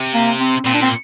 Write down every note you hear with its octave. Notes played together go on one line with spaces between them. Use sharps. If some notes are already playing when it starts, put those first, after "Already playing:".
Already playing: C3
A#3
C4
A#2 C4
D4
C4